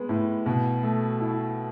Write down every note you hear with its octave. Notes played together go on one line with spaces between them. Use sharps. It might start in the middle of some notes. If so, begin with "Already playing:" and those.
Already playing: G#3 B3
A2
B2
A3
E4